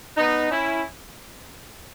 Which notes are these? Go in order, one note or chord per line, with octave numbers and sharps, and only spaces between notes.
B3 D#4
C#4 E4